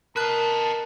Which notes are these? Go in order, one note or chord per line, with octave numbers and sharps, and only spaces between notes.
A#4 B4 D#5 A5 F#6